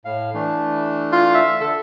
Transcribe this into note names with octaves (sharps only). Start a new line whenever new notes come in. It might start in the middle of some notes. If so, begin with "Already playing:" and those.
A2 F5
E3 A3 D4
F4
E5
D3 A4